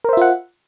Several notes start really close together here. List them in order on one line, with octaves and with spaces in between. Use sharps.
A#4 C5 E5 F4 F#5